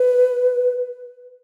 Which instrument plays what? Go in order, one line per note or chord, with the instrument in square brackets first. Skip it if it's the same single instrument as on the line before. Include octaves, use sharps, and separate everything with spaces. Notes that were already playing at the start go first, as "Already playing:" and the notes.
Already playing: [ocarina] B4